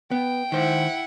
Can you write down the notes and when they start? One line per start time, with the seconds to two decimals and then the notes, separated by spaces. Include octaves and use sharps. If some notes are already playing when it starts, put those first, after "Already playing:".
0.11 B3 G5
0.52 D#3 E4 C5 F#5